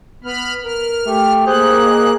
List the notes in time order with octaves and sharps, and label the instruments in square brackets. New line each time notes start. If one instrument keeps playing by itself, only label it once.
[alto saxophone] B3 [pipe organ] B5 F6
[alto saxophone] A#4 [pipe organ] F6
[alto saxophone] A3 [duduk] G4
[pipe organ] A#3 F#6 [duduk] G#4 [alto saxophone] C5
[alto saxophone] D#5